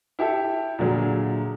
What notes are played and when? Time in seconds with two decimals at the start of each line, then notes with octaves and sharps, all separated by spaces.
0.19 E4 G4 A4 E5
0.79 A#2 D3 F#3 G#4